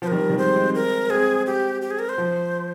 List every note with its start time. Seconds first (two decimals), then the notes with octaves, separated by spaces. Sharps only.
0.02 F3 C5
0.07 D#3 G3 A#4
0.30 D#3 G3
0.38 G#3 C4 C5
0.56 G#3 C4
0.74 A#4
1.10 G#3 C4 G#4
1.46 G4
1.81 G4
1.90 G#4
1.99 A#4
2.09 C5
2.18 F3